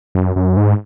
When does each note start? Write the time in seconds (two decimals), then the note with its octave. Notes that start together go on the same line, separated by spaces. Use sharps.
0.15 F#2
0.36 F#2
0.57 G#2